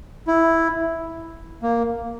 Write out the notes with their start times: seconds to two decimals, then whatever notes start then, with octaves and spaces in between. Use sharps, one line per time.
0.28 E4
1.63 A#3